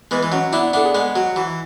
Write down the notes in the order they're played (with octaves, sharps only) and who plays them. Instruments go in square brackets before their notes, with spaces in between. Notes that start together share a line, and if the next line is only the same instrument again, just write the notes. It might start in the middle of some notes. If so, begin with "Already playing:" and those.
[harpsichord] E3 G#3 [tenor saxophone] B3
[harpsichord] E3
[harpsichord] F#3 [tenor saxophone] C#4
[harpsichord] B3 D4 [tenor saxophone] E4
[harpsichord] B3 D4 [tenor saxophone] A4
[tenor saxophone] G#4
[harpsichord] G#3 B3
[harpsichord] F#3 [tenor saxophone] F#4
[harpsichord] E3 [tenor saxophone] F#4